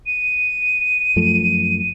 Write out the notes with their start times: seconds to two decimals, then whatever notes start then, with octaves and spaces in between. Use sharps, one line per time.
0.06 D#7
1.16 F#2 F3 A3